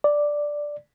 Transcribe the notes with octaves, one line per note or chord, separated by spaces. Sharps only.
D5